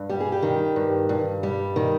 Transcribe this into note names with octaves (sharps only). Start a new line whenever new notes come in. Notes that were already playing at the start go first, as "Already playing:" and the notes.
Already playing: G2
G3 G4
G#4
G4
D#3
G2
G2
G3
D#3